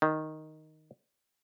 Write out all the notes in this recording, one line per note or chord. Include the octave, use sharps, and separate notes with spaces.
D#3